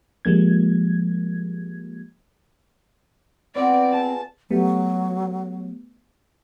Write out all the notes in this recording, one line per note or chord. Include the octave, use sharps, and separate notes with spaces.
F3 G3 G#3 A#3 G#6
B3 C4 F4 D5
G#4 A5
F#3 G3 A3 B3